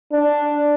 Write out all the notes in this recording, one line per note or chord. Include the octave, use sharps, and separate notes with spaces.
D4